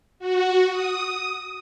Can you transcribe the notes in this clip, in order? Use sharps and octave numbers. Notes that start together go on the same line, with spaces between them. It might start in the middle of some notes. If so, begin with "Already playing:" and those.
F#4
D#6